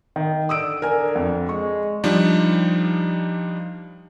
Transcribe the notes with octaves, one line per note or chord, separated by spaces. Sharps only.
D#3
D3 D#6 E6 D7
D3 A#4 G#5
F2
G#3 C#6
F3 G3 D4 D#4